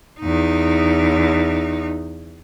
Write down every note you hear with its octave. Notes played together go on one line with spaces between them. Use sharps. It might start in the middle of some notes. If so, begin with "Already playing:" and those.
E2 D#4